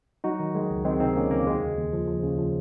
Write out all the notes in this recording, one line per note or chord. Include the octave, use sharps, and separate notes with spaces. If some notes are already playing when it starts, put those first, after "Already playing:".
F#3 D#4 F#4
D#3
D#3 G#3
C#2
D#3 G#3 C4
C3 C4 D#4
D#3 A#3 C#4
C#2 A#3
D#2 G#3
C#3
D#2
F3
F3
C#3
F3